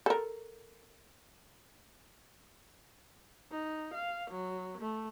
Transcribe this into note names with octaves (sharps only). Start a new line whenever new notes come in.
A4 A#4
D#4
F5
F#3
A3